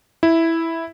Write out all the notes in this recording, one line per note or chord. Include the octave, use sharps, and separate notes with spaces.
E4